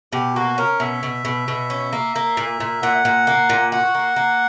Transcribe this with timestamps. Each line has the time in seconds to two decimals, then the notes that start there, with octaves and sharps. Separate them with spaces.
0.13 B2 G4
0.35 A#3 F#4
0.58 C#4 A#4
0.80 B2 E5
1.03 B2
1.25 B2
1.48 B2
1.70 C#4
1.93 A#3
2.16 A#3
2.37 A#2
2.60 A#2
2.82 A#2 F#5
3.05 A#2
3.27 A#3
3.50 A#2
3.72 F#4 F#5
3.95 A#3
4.16 A#3